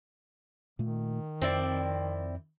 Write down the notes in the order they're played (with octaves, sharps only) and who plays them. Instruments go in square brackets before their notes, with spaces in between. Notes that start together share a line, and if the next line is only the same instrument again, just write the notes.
[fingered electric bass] A#2 A3 [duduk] D#3
[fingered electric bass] F2 [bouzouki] C4 E4 D5